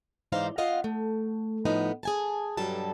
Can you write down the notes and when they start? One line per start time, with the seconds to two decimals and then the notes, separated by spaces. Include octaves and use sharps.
0.32 G#2 E3 D#4 C5 D5 F5
0.58 C4 F4 D#5 F5 F#5
0.84 A3
1.65 A2 F3 B3 D#4
2.03 G#4 G#5 A5
2.57 G2 B2 F#3 G3 A4 A5